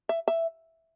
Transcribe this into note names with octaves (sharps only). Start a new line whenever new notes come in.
E5
E5